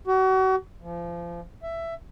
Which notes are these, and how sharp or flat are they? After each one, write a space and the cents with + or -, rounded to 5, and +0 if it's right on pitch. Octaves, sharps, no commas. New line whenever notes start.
F#4 +35
F3 -30
E5 +10